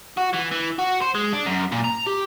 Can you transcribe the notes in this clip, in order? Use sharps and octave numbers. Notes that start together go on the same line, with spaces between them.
F#4
E3
E3
F#4
C5
G#3
D4
F#2
A#2
A#5
G4